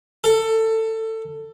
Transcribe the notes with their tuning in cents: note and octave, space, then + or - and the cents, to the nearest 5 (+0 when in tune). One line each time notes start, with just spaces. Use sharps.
A4 +20